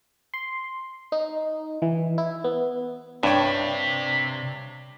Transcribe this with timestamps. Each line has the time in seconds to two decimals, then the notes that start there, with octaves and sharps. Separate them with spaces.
0.34 C6
1.12 D#4
1.82 E3
2.18 E4
2.44 B3
3.23 G2 C3 D4 C#5 E5 G5